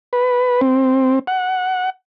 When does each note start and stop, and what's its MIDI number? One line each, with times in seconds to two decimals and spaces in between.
0.13 0.61 71
0.61 1.19 60
1.27 1.90 78